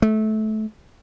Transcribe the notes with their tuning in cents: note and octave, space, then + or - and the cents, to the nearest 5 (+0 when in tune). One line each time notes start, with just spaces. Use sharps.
A3 -20